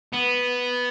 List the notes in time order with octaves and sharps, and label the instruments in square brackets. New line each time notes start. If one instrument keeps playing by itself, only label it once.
[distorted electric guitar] B3